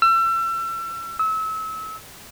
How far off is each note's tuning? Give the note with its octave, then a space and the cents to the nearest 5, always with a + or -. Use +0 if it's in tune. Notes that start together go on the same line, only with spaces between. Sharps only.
E6 +35
E6 -30